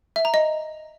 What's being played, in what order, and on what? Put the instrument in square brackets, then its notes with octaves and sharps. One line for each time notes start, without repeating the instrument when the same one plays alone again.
[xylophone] E5
A#5
D#5